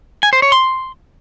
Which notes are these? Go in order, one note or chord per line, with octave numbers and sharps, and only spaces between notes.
G#5
C5
C#5
C6